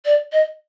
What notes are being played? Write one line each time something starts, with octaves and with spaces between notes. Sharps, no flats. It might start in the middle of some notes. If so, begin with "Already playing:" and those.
D5
D#5